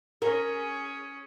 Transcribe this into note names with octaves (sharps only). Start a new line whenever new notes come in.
C#4 G#4 A#4